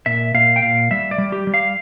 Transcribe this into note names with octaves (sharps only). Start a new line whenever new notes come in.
A#2 E5
A#2 F5
G5
A#2 F5
G3 E5
D5
G3
G4
G3
F5